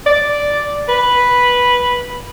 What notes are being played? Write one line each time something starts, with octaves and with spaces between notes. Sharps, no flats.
D5
B4